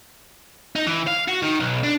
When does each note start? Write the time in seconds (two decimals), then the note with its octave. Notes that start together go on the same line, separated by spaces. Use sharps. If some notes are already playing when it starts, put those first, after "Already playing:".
0.76 D#4
0.87 E3
1.07 F5
1.28 F#4
1.42 D#3
1.60 B1
1.83 D4